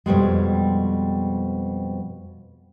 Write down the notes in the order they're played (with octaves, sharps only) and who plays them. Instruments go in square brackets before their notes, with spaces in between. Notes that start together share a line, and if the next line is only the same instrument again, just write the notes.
[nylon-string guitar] F2 B2 G3 G#3